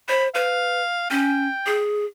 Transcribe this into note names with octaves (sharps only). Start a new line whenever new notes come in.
C5 B5
B4 F5
C#4 G5
G#4